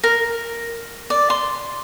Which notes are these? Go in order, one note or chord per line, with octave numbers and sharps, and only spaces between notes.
A#4
D5
C6